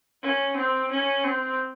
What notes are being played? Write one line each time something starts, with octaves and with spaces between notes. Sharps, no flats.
C#4
C4
C#4
C4